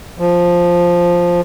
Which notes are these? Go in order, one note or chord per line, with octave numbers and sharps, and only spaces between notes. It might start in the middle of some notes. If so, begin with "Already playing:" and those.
F3